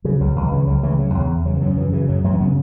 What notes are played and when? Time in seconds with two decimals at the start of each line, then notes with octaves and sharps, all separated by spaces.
0.04 C#3 F#3
0.21 C#2 F#3
0.36 C#2 F#3
0.52 C#3 E3
0.67 C#2 F#3
0.83 C#2 E3 A3
0.99 C#3 F#3
1.14 E2
1.30 E2
1.46 C#3 F#3
1.57 E3
1.62 F#2 F#3
1.77 F#2 E3
1.92 C#3 E3
2.08 F#2 F#3
2.24 F#2 E3 A3
2.34 C#4
2.40 C#3 F#3 B3